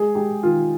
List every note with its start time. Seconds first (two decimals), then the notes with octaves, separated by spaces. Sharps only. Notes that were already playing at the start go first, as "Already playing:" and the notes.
Already playing: G#3 G#4
0.15 G#3 G4
0.43 D#3 F4